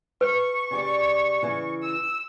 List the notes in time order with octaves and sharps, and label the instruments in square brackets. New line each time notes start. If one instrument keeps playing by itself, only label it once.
[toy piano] B4 [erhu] C#6
[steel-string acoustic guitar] C#3 G4 D5
C#3 E3 E4
[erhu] E6